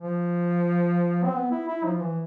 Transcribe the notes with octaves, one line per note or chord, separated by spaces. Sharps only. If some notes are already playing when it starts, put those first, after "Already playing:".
F3
C4
B3
E4
E4
F3
E3